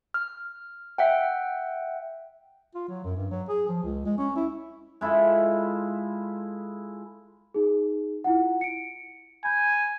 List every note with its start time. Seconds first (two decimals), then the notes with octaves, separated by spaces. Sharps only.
0.14 F6
0.98 E5 F#5 G5
2.75 F4
2.88 F#3
3.04 F#2
3.17 G2
3.31 F#3
3.49 G#4
3.68 F3
3.83 C#2
4.05 G#3
4.18 C#4
4.36 E4
5.01 G#3 E4 F4 A4
7.55 D#4 G#4
8.24 E4 F4 F#5
8.61 C#7 D7
9.45 G#5 B5 G6